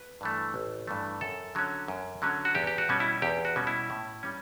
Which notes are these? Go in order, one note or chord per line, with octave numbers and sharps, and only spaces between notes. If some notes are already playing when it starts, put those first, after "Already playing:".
Already playing: B4
G2 E3 A3
A1
G2 E3 A3
F#2 A4
D3 F#3 C#4
F#2
D3 F#3 C#4
F#4
E2 G4
G4
F#4
B2 G3 C#4
E4
E2 G4
F#4
B2 G3 C#4
E4
A2
G3 C#4